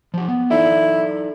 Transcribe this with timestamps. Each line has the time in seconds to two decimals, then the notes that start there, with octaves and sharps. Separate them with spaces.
0.14 F3 G4
0.28 B3
0.50 D#4 E4 A4 D5